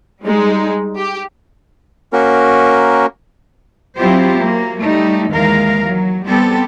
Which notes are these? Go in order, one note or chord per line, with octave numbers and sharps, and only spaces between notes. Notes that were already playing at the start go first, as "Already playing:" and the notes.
G3 G#3 D#4
G4
A#3 C#4 F#4 A#4
F#3 C4 E4 F4 G4 C5
F#3 A#3
G3 A3 D#4
D#2 E3 G#3 A#4 F5
F#3
G3 B3 C4 G4 A4